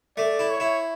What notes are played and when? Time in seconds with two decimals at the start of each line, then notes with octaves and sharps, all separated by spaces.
0.17 A3 D5
0.39 E4
0.50 C#5
0.60 E4